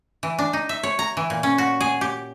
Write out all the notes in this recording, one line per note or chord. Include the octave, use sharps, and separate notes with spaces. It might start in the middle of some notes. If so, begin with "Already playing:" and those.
E3
D4
D#4
E5
C#5
A#5
E3
A#2
C#4
F#4
G#4
G4